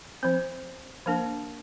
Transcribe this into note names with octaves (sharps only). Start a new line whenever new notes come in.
F3 C4 C5
F3 A#3 D4 A#4